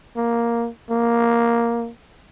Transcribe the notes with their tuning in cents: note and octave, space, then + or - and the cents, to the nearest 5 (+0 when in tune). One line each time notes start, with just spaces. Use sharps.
A#3 +5
A#3 +5